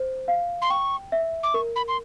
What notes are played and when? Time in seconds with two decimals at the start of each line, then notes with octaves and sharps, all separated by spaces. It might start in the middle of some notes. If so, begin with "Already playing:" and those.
Already playing: C5
0.28 F5
0.62 C6
0.70 G5 C#6
1.12 E5
1.43 D6
1.54 A#4 C#6
1.76 B5
1.88 C6